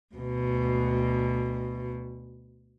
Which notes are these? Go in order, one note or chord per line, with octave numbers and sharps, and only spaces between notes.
D2 B2